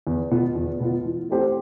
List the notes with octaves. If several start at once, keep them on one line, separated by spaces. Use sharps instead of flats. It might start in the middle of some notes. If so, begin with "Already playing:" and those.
E2
B2 B3 F4
E2
B2 B3 F4
E3
A3 C4 G4 C5